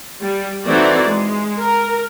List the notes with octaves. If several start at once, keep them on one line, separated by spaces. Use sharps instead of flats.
G3
E3 A3 C4 D#4 F#4 D5
G#3
A#4